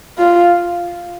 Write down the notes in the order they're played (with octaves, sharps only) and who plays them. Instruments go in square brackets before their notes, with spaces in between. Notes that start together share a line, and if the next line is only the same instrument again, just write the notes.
[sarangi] F4